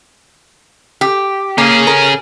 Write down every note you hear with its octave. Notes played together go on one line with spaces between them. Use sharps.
G4
A#3 C#4 G#4
A#4